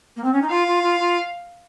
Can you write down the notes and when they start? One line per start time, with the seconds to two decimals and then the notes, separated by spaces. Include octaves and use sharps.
0.16 A#3
0.24 C4
0.33 C#4
0.41 D#4
0.50 F4 F5
0.67 F4
0.82 F4
0.99 F4